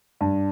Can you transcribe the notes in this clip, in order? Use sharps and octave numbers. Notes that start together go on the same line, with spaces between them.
G2